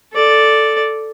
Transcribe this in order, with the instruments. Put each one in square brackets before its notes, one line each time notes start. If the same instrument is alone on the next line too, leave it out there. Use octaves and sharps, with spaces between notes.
[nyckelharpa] A4 D5